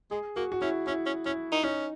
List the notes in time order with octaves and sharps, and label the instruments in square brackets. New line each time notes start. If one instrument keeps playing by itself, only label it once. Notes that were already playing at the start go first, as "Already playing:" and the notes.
[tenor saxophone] G#3 [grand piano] G#4
[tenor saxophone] A#3 [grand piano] F#4
[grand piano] F#4
[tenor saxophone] C#4 [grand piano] E4
[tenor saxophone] C#4 [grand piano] E4
[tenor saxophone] C#4
[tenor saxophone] C#4 [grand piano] E4
[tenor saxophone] D#4
[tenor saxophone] C#4 [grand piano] D#4